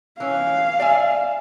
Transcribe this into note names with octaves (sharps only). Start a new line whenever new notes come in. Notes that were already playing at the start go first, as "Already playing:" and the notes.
E3 C#4 F5
D5 E5 G#5